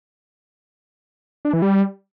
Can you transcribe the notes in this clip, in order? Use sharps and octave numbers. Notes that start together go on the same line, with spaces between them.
D4
E3
G3